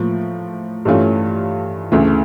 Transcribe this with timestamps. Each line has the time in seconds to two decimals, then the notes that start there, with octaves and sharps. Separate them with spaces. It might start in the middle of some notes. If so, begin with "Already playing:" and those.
Already playing: A2 F3 A#3
0.85 G2 E3 A3 C#4 F4
1.92 D2 C#3 E3 A3